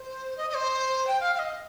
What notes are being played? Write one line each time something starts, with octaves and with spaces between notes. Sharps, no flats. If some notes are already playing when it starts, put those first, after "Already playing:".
Already playing: C5
D#5
D#5
C5
G5
F5
F5
D#5